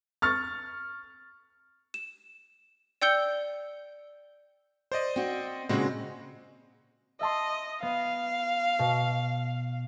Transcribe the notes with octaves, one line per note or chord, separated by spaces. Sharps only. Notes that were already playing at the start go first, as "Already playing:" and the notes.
C#6 F6 A6
E7
D5 G5 E6 G6 C#7 G7
C5 D5 D#5
C4 F#4
A#2 C#3 G#3 C4 F#4
D#5 E5 A5 C6
B3 F5
B2